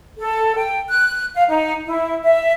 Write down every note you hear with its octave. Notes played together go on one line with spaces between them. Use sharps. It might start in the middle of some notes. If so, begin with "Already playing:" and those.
A4
G5
F#6
F5
D#4
E4
E5